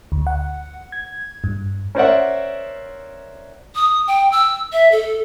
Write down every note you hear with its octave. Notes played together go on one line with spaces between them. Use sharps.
D2
F#5
G#6
G2
C#4 A#4 C5 D5 E5 F#5
D#6
G5
E6
E5
A4